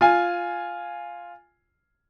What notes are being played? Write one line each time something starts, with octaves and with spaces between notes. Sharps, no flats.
F4 G#5